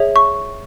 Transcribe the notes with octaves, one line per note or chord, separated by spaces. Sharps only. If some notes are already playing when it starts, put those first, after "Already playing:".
Already playing: G#4 C#5 E5
C#6